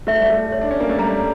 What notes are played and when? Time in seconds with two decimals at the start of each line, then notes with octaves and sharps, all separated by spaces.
0.07 A3 E5
0.19 G3
0.30 A3
0.52 C#5
0.61 D4
0.71 C#4
0.80 A#3
0.89 A3
0.99 G3 A#5